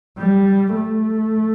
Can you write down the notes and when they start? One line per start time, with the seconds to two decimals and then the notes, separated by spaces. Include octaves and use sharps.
0.18 G3
0.75 A3